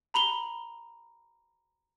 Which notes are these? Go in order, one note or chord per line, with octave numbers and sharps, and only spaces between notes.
A#5 B5 F7 G7